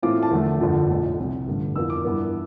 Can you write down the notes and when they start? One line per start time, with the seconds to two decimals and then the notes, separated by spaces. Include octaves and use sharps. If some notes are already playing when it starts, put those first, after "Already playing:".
0.02 A2 E3 A3 C4 F4 D6
0.23 A5
0.31 E2 D3 F3 A3
0.61 G1 F2 D3 F3
0.89 B1 A2 F3
1.18 C2 C3 F3
1.47 A1 G2 D3 G3
1.76 F2 E3 B3 F4 E6
1.90 D6
2.05 G2 E3 B3